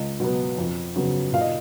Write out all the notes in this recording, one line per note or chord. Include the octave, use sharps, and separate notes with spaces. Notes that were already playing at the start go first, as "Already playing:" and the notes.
Already playing: C#2 D#5
B2 F#3 B3
F2
C#3 F#3 B3
A#2 F5
D#5